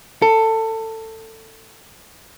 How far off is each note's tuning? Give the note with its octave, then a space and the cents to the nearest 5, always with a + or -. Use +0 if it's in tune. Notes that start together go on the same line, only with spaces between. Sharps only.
A4 +20